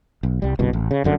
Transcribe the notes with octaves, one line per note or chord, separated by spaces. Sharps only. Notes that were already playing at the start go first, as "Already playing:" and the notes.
B1
C2 G3
G1 C2 B2
A1
C#3
G1 F#2 D3